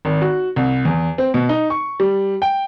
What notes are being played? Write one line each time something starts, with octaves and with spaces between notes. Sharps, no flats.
G#1
F#4
C2
E2
C4
B2
D#4
C#6
G3
G5